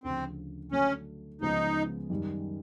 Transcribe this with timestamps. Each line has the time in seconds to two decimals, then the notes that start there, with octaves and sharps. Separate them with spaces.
0.04 D2 C#3 F3 C4
0.72 D3 F#3 A3 C#4 D4
1.41 C#2 C#3 F3 G#3 B3 D#4
2.10 F#2 D#3 G3